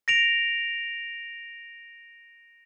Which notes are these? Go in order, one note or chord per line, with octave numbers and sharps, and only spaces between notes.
A#6 D7 F7